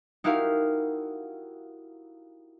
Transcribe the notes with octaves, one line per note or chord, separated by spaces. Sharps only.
D#4 E4 F#4 G4 A#4 F5